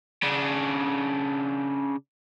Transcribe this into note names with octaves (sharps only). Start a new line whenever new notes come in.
C#3 D4